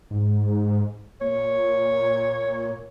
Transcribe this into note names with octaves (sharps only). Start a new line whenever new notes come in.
G#2
A#2 C#5